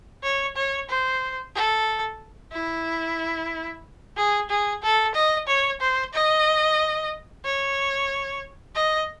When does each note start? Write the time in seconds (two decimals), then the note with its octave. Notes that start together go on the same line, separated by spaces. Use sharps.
0.23 C#5
0.56 C#5
0.89 C5
1.55 A4
2.52 E4
4.17 G#4
4.50 G#4
4.83 A4
5.15 D#5
5.47 C#5
5.81 C5
6.14 D#5
7.45 C#5
8.75 D#5